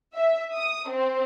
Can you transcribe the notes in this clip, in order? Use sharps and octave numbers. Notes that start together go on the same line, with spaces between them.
E5
D#6
C4